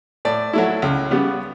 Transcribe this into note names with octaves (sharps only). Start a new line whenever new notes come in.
A2 D5
F#3 A3 E4
C#2
C#3 G3 B3